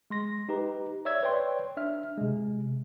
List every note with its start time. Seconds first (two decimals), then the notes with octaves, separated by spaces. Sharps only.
0.10 G#3 C6 A#6
0.49 D#4 G4 B4 A#5
1.05 C#5 D5 E5 E6 G#6
1.23 B4 C#5 D5 G5 C6
1.77 D4 E5 F6
2.18 C3 G#3